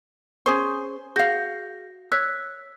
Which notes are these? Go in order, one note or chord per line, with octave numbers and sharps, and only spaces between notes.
C#4 G#4 C5 C#6
F#4 G#4 F5 G6 A#6
C#5 E6 F#6 B6